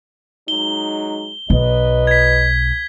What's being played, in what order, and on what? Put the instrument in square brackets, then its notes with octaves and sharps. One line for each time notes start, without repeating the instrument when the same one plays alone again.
[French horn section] F#3 G#3 D#4 [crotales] G7
[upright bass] B1 [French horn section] F#3 B4 D#5
[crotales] G#6 B6